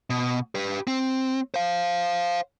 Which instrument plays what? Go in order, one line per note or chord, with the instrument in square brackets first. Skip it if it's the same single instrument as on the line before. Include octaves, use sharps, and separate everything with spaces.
[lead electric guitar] B2
G4 B4
C4
C5 F5